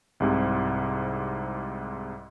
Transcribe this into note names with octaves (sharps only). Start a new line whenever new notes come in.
C2 G#2 C3